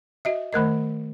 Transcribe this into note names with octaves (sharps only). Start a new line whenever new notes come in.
F#4 D#5 E5
D#3 A3 A#4 D#5